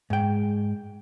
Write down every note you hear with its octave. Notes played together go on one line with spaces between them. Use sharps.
G#2 G5